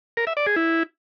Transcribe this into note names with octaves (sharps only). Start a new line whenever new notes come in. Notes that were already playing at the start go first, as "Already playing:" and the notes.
A#4
E5
D5
G#4
E4